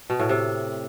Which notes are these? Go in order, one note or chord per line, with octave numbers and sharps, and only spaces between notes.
B2
A2
C3